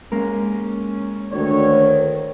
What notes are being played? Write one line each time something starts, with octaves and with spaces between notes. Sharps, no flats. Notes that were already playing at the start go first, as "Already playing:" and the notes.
G#3 A#3 C#4 A#4
D2 D#3 C#5